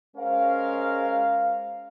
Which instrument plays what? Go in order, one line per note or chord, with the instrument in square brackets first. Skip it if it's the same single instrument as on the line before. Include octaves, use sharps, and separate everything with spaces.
[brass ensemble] G#3 C#4 A#4 C5 F5